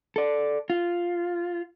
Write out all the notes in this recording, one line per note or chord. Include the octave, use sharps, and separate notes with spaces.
A4 D5
F4